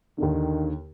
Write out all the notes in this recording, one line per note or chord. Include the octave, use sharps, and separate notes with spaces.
D#2 D3 D#3